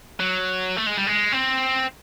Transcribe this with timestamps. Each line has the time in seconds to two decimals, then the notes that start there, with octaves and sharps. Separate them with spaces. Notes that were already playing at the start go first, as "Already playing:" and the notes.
0.20 F#3
0.76 A3
0.86 G#3
0.97 G3
1.07 G#3
1.33 C4